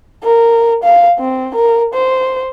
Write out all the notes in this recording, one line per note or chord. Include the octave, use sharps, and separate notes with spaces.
A#4
F5
C4
A#4
C5